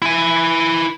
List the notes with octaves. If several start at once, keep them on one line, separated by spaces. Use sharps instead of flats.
E4 G#5